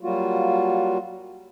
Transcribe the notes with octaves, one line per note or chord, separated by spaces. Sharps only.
F#3 G3 A#3 F4 F#4